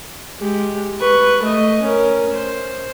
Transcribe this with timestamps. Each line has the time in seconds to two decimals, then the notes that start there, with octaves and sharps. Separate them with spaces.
0.39 G#3 G4
1.00 B4 C#6
1.43 A3 D#5
1.82 C#4 A#4
2.34 C5